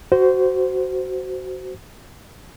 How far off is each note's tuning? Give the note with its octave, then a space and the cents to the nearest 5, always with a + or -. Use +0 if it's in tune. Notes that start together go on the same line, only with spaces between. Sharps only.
F#4 +15 C5 -15